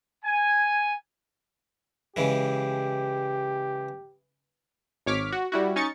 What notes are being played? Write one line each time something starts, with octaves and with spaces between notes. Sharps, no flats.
G#5
C#3 E3 G#3 G4
G#1 C#5 D6 F6 B6
F#4
G3 E4 F#4
C#4 D#4 C#6 A6 C#7